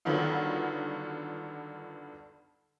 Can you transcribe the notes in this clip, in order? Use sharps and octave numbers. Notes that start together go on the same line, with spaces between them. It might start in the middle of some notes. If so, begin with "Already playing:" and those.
G2 D3 D#3 F#3 B3 F4